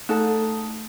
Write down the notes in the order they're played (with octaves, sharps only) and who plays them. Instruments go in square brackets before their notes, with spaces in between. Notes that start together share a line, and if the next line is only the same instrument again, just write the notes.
[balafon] A3 [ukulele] D#4 A4 A5